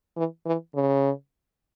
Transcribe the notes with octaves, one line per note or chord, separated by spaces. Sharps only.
E3
E3
C#3